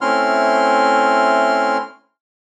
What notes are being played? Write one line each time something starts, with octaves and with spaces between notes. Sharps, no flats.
A3 C4 C#4 E4 C6 F6